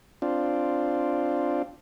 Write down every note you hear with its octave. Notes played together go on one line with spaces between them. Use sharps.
C4 D4 F4